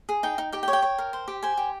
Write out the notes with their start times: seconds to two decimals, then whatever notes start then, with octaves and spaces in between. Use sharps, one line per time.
0.09 G#4
0.23 D#4 G5
0.38 D#4
0.53 G4 G5
0.63 G5
0.68 C#5
0.73 G5
0.82 C#5
0.98 A#4
1.13 C5
1.28 G4
1.43 C5 G#5
1.57 G4